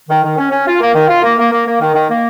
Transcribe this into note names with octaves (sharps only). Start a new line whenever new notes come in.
D#3
D#3
C#4
C#4
F4
A#3
D#3
F4
A#3
A#3
A#3
A#3
D#3
D#3
A#3